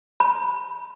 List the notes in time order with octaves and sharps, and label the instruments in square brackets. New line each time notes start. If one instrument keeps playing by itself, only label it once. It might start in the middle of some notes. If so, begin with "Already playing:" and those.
[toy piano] B5